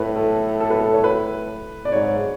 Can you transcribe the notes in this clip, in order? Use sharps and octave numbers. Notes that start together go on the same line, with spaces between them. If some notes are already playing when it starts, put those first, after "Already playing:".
Already playing: A2 B4
A4
A4
B4
A4
C#5
B4
D5
G#2 C#5